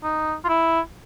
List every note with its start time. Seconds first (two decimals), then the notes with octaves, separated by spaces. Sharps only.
0.03 D#4
0.44 F4
0.49 E4